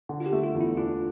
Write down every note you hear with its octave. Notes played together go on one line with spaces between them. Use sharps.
D3
F4
G4
A3
F4
E2
E4
D4 F4